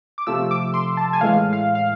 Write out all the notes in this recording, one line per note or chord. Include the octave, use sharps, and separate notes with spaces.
D6
C3 F3 A3 E6
D6
C6
A5
G#5
A2 E3 G#3 F5
F5
F5